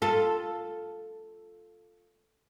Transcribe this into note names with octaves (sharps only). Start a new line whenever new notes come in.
F4 A4